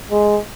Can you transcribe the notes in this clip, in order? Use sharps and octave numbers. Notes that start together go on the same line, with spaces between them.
G#3